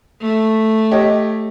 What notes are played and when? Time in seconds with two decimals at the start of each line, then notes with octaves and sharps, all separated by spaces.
0.21 A3
0.91 G4 C#5 D#5